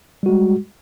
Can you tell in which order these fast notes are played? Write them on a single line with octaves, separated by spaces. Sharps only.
G3 F#4 G#3